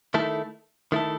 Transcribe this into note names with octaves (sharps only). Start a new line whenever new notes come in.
D#3 A3 E4 A4
D#3 A3 E4 A4